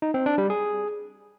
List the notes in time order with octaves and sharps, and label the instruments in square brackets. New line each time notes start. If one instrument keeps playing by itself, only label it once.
[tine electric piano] D#4
C4
D4
G3
G#4